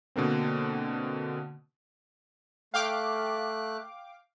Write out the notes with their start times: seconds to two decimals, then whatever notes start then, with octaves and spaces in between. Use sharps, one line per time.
0.16 B2 D3 A#3 C4
2.74 A3 F5 G5 D6 F#6